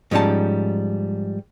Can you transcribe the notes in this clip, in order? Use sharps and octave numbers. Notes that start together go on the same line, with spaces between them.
G#2 F3 G3 C#4 D#4 A5